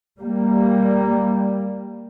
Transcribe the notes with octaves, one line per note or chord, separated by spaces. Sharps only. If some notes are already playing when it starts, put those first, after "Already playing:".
G3 A#3